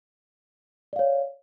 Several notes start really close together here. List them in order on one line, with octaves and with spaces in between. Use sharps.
D5 F5 C#5